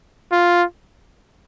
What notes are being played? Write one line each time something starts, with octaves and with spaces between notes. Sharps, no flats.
F4